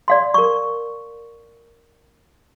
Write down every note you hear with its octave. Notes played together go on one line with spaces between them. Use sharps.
D5 F5 C6
A#4 C#6